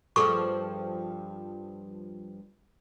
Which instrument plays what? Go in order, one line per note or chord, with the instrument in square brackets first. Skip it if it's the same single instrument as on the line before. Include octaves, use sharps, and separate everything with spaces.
[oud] G2 F3 [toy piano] G#4 A4 C#6